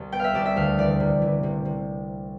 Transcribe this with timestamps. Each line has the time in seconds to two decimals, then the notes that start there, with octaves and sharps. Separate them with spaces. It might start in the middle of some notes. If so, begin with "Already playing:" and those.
Already playing: C2
0.12 B3 G5
0.19 E5 F5
0.34 C2 D5
0.45 E5
0.56 D2 F5
0.78 E3 D5
1.00 C3
1.22 E3
1.43 C3
1.65 C3